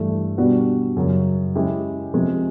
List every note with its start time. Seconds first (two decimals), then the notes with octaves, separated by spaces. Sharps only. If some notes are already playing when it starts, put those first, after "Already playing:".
Already playing: G2 E3 A3
0.37 B2 G3 B3 D4 F#4
0.97 F#2 C#3 F#3
1.55 G#3 C#4 E4 G4
2.14 C3 F3 G#3